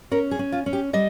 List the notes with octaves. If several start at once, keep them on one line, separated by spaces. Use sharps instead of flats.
C#4 A#4
G#4
C#4
F4
C#4
G4
G3 D#5